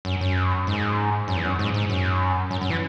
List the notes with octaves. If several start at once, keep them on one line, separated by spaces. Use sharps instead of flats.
F#2
F#2
G#2
F#2
E2
F#2
G#2
G#2
F#2
F#2
F#2
E3